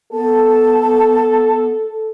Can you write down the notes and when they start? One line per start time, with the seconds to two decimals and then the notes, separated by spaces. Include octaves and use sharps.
0.13 B3 A4 A5